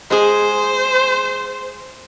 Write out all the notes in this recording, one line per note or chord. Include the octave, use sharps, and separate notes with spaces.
G#3 G#4 C5